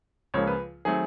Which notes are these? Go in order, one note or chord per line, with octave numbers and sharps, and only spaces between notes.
C#2 C#3 F3 A#3 C#5
B4
D#3 F#3 A3 C4 G#4